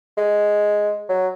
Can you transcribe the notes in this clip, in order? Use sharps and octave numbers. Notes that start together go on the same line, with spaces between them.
G#3
F#3